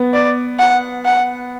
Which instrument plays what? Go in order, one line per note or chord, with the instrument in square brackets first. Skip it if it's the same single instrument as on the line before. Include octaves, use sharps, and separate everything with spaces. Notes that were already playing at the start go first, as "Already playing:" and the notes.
Already playing: [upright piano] B3
[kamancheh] D5
F#5
F#5